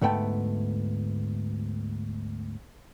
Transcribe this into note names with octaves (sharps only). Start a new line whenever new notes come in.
D2 G#2 A3 B3 G5 A5